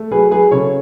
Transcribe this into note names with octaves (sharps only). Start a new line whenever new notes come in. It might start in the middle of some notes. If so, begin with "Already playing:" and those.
Already playing: A3
F#3 G#4 B4
F#3 G#4 B4
C#3 A4 C#5